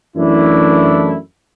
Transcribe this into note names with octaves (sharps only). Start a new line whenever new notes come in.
F#2 E3 A3 D4 E4